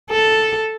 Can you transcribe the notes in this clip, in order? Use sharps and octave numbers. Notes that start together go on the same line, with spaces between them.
A4